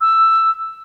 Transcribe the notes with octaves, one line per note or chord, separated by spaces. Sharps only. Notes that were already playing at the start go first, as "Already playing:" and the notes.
E6